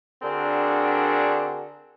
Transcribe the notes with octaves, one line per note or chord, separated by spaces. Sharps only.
D3 C4 D4 F#4 G#4 A#4